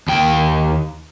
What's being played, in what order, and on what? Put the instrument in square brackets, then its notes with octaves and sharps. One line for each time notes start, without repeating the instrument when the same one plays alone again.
[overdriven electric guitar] D#2 G5